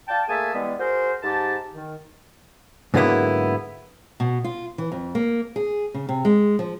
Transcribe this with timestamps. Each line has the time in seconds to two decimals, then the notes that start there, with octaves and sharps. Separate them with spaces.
0.09 D5 F5 G5 A5
0.29 A3 A#3 G#4 E5 G#5 A5
0.54 E3 G3 G#3 B3
0.79 F#4 G#4 A#4 C5
1.23 G#2 G4 A5
1.74 D#3
2.94 G#2 D3 F#3 A#3 B3 E4
4.20 B2
4.44 F4
4.78 E3
4.92 F2
5.15 A#3
5.56 G#4
5.94 C#3
6.09 C3
6.25 G#3
6.59 F3